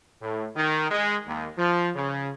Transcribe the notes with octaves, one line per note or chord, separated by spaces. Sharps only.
A2
D#3
G#3
D#2
F3
C#3